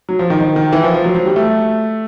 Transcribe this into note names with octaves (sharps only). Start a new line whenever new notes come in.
F#3
F3
D#3
D#3
D#3
E3
F3
F3
F#3
F#3
G3
A3